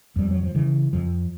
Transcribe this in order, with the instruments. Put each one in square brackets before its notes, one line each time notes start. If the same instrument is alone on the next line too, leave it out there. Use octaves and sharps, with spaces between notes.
[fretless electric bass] F2 G3
F#3
F3
C#3 E3
F2 F3